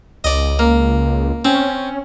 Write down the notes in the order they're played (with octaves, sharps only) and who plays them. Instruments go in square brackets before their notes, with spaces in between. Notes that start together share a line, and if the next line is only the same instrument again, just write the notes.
[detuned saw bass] C#2 [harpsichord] D5 D#5
[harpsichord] A#3
[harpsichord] C4 [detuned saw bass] C#4